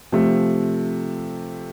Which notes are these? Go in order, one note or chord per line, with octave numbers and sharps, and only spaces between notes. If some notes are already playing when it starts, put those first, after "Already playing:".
C3 F3 A3